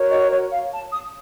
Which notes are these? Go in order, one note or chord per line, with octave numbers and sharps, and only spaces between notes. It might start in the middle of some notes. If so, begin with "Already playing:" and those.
Already playing: F#4 A#4 C#5
D#5
C#5
F5
A5
D#6